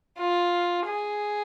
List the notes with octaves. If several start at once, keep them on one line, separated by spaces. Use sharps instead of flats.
F4
G#4